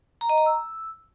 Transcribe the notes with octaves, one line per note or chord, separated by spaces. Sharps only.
A#5
D#5
A#5
E6